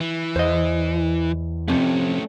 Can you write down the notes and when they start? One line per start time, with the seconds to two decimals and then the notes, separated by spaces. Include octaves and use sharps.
0.01 E3
0.36 E2 C5 D#5
1.68 F2 C3 A3 C#4